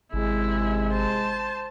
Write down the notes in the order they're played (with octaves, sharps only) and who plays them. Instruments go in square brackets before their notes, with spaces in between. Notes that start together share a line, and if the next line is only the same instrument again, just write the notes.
[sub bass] G#1 [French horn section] C3 G#3 [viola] E4
[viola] C5 A5